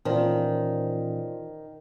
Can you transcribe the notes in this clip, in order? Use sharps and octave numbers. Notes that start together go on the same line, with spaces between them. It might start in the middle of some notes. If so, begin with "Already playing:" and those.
A#2 D#3 E3 C#4 F4 C5 D5 A5